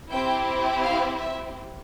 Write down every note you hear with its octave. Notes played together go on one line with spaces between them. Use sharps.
C4 E4 G4 G5
F5
E5